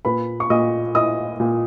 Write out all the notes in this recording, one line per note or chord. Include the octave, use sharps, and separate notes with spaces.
A#2 B4 B5
C#6
A#2 D#5 D#6
E4 D#5 D#6
A#2